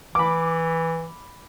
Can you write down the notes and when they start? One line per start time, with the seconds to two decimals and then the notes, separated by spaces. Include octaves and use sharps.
0.15 E3 B5 D6